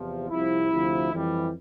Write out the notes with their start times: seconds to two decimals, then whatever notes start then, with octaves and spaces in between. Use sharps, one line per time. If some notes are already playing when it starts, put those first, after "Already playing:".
Already playing: E2 C3 F3
0.29 C2 C3 F3 E4
0.70 D2 C3 F3
1.10 F2 E3 G3